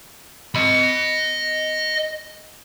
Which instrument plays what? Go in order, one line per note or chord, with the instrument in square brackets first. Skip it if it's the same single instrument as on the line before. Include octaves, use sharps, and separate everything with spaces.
[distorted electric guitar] D#5 B5